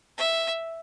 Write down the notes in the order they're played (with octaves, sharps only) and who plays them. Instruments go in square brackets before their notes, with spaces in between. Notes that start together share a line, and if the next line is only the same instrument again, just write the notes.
[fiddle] E5